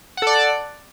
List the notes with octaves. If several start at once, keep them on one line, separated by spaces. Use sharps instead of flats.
A4 D5 F#5